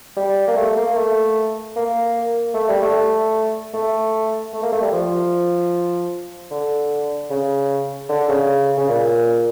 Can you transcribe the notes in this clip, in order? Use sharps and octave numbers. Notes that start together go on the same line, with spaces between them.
G3
A#3
A3
A#3
A3
A#3
A3
G3
A3
A3
A3
A#3
A3
G3
F3
D3
C#3
D3
C#3
C#3
A#2